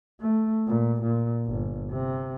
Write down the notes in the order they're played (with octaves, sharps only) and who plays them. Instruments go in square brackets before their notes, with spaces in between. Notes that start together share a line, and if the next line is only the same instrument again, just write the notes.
[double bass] A3
A#2
A#2
G1
C3